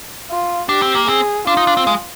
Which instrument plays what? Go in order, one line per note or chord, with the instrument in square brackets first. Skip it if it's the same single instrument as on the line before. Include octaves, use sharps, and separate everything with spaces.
[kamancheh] F4
[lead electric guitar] D4 [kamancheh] G4
[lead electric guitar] C4
A#3
[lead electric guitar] C4 [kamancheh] G#4
[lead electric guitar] D4 [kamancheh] F4
[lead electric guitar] D#4
D4
C4
G#3